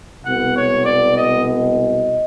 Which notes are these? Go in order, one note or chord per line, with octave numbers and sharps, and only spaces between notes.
C2 B2 G#3 B3 F#5
C#5
D5
D#5
D#5